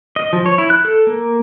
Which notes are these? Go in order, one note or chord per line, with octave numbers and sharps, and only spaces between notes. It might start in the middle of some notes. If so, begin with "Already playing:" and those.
D#5
F3
C#5
E4
F#6
A4
A#3